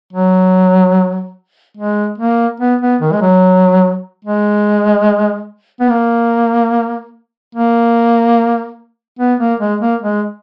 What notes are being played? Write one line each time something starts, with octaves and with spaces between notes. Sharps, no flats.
F#3
G#3
A#3
B3
B3
D#3
G#3
F#3
G#3
B3
A#3
A#3
B3
A#3
G#3
A#3
G#3